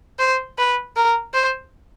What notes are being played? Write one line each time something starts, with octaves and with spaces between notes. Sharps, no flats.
C5
B4
A#4
C5